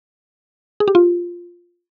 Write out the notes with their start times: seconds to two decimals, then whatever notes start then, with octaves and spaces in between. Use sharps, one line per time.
0.80 G#4
0.88 G4
0.95 F4